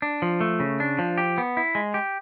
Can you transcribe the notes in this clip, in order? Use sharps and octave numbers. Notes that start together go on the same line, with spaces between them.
D4
F3
A3
C#3
D4
F3
G4
B3
E4
G#3
G4